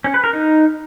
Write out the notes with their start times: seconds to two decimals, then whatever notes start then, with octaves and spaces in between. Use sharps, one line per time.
0.04 C#4
0.14 B4
0.24 A#4
0.33 D#4